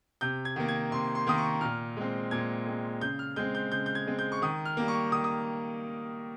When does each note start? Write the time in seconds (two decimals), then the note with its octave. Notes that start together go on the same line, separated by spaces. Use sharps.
0.21 C3 G6
0.45 G#6
0.56 D#3 A#3
0.68 G#6
0.91 C3 C6
1.15 C6
1.27 D#3 A#3 D#6
1.38 C#6
1.61 A#2 F6
1.97 G#3 C4
2.31 A#2 G#6
2.66 G#3 C4
3.01 C#3 G6
3.19 F6
3.36 G#3 C4 G6
3.55 G6
3.72 C#3 G6
3.86 G6
3.95 G#6
4.07 G#3 C4
4.19 G6
4.32 C#6
4.42 D#3 D#6
4.65 F6
4.77 G3 A#3
4.88 C#6
5.12 D#3 D#6
5.24 D#6